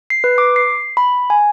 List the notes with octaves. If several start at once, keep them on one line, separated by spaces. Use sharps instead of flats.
C7
B4
D6
C7
B5
G#5